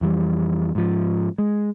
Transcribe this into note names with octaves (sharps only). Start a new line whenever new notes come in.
F2 E3 G3
G#2 F3
G#3